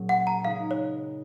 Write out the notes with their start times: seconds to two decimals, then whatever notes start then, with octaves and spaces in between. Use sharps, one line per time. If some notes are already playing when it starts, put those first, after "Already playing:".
Already playing: A#2 F#3 C#4 G#4
0.09 F#5
0.27 A#5
0.44 C#3 G#3 D#4 G#4 F5
0.71 C#5